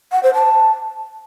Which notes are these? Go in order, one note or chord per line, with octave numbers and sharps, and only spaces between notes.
F#5
C5
A5